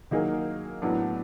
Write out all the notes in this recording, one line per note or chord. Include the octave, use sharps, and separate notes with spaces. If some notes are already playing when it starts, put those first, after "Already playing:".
D#3 F#3 A#3 D#4 G#4
A2 F#3 B3 D4